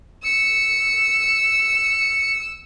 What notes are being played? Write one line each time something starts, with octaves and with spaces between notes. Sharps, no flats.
E6 C#7